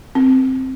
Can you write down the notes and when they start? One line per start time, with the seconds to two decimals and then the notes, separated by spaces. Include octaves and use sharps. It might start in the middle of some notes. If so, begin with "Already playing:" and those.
0.15 C4